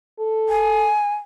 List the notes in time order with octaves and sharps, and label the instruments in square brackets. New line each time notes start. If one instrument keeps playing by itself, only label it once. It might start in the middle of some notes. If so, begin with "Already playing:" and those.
[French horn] A4
[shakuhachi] G#5